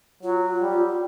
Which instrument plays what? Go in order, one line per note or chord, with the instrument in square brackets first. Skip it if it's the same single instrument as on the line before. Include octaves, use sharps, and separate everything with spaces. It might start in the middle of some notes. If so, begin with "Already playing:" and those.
[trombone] F#3 [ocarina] F4
[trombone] G3